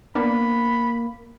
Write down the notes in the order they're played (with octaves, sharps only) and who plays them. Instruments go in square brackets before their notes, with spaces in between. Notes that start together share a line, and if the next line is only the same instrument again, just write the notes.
[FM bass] A#3 [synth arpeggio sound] B3 D4 [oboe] B5